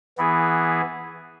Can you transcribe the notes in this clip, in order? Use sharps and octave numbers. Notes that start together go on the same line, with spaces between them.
E3 B3 E4 G#4